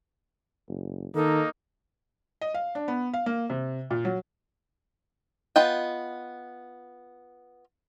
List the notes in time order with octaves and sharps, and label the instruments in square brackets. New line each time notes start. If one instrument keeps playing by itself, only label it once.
[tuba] F#1
[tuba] D#3 [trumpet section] A#3 D#4 [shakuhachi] A4
[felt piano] D#5
F5
D4
B3
F5
A#3
C3
A#2
F#3
[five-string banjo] B3 F4 D#5 G5